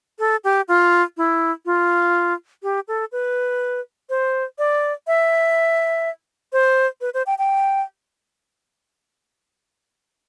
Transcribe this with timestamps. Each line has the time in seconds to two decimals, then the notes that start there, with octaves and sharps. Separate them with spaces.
0.19 A4
0.44 G4
0.68 F4
1.17 E4
1.65 F4
2.63 G4
2.88 A4
3.12 B4
4.09 C5
4.58 D5
5.07 E5
6.53 C5
7.01 B4
7.14 C5
7.26 G5
7.38 G5